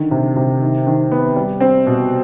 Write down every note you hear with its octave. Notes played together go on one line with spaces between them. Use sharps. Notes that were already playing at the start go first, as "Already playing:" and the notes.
Already playing: D3 D#3
C3
C3
D#3
D#3
B3
G3
C4
B2